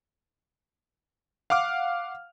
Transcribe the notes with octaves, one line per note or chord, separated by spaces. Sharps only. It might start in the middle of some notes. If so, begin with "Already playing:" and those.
F5 F#5 D6 F6